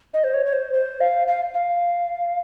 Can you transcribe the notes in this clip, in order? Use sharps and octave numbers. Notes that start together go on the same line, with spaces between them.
D#5
C5
C#5
C#5
C5
C5
F5
F5
F5